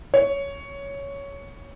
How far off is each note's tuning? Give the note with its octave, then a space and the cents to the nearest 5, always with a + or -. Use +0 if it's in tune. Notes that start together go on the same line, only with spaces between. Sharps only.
C#5 +10